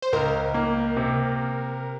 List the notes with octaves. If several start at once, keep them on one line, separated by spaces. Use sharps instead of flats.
C5
C#2 A#4
A#3
C3